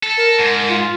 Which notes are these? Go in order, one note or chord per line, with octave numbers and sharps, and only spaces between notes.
A4
A#4
G#2
F4